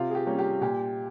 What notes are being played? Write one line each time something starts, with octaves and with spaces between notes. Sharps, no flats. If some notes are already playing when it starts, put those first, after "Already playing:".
Already playing: C3 F4
G#4
G4
G3 A#3 C#4
G4
A#2 G4